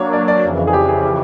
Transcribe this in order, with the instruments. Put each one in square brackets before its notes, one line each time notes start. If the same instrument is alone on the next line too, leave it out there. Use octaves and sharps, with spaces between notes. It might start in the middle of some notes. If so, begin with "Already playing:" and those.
Already playing: [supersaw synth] F#3 A#3 D4 [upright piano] C#5
[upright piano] D5
D5
[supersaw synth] F2 C#3 E3
[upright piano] G#4
G4
G#4
G4